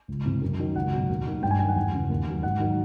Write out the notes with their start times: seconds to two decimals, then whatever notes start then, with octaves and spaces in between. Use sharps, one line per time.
0.08 C#2
0.26 C3 E3
0.42 F#2
0.59 D#3 F#3
0.76 C#2 F#5
0.92 B2 F#3
1.09 D#2
1.26 D#3 F#3
1.42 G2 G5
1.51 G#5
1.59 F#3 G5
1.63 D#3
1.68 F#5
1.76 E2
1.93 C#3 E3
2.09 D#2
2.27 C#3 F#3
2.43 G#2 F#5
2.60 D#3 F#3